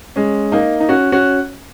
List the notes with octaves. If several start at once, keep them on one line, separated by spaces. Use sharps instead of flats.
G#3 C#4
A#3 D#4
D#4
C#4 F#4
C#4 F#4